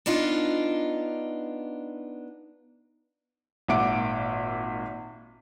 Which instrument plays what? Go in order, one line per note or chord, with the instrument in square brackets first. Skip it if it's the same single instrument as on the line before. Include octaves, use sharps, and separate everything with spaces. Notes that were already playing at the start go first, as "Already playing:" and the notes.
[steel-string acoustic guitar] B3 D4 D#4 F4
[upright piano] G#1 A#2 E5 F#5 D6 D7